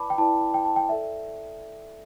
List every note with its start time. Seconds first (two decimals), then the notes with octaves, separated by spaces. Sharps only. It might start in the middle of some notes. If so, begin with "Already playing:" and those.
Already playing: E4 B4 D5 A5 B5 D6
0.10 G5
0.18 E4 B4 D5 A5
0.54 G5
0.65 A5
0.76 G5
0.89 A4 D5 E5